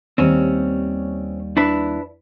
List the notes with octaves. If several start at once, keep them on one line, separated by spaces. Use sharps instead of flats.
D#2 G3 C4 C#4
D4 E4 B4